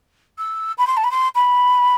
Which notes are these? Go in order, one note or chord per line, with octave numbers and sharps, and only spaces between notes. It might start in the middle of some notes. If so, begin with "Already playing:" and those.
E6
B5
C6
A5
B5
C6
B5